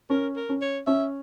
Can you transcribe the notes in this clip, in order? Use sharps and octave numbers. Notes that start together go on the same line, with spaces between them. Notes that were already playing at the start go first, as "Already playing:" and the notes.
C#4 A#4
A#4
C#4
C#5
C#4 E5